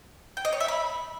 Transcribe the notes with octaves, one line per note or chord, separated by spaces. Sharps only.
G5
D#5
C#5
E5
B5